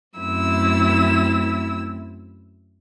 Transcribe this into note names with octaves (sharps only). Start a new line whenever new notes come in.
F#2 A3 C4 E4 E6